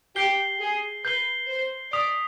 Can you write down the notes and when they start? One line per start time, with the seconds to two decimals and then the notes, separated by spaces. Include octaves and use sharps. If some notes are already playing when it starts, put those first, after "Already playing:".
0.16 G4 G6 C7 G7
0.60 G#4
1.05 B4 G6 C7 G7
1.49 C5
1.93 D5 D#6 B6 F7